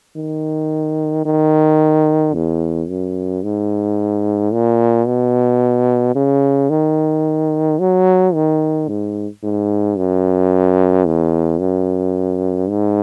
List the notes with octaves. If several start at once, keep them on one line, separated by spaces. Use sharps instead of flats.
D#3
D#3
E2
F#2
G#2
A#2
B2
C#3
D#3
F#3
D#3
G#2
G#2
F#2
E2
F#2
G#2